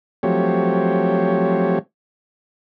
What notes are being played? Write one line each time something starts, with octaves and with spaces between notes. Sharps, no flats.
F3 F#3 A3 C4 G4 C#5